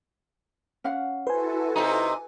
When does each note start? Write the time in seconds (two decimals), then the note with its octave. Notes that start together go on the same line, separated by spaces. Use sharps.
0.84 C#4 F5 F#5
1.27 E4 F#4 A4 B4 C5 G#5
1.76 C3 D#4